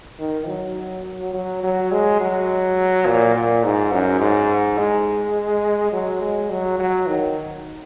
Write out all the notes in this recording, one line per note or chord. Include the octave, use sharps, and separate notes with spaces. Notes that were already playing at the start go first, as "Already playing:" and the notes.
D#3
F#3
F#3
F#3
G#3
F#3
A#2
A#2
G#2
F#2
G#2
G#3
F#3
G#3
F#3
F#3
D#3